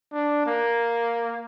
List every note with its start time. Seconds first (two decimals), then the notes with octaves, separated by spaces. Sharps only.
0.13 D4
0.46 A#3